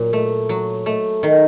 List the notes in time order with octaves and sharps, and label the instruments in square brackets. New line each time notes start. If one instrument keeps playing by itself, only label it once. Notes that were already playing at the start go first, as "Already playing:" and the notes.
Already playing: [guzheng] A#2 F#3
A3
F#3
A3
D#3